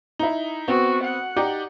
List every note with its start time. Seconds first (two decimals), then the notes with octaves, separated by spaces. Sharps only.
0.19 D#4 E4
0.68 B3 C4 F#4
1.04 F#5
1.36 D#4 G4 D5